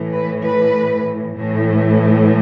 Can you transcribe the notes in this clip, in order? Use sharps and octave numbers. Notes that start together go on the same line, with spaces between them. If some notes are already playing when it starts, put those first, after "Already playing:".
Already playing: A2 E3
B4
B4
A2 E3